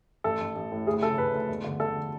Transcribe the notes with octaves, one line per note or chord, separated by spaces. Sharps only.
A1 A4
A1
A1
A2
D2 G#4
C#3 A4
D2 B4
D2
E1
D3
D3 A4